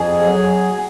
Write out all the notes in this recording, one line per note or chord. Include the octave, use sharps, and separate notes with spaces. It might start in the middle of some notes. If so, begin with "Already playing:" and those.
Already playing: F2 G#4
F#3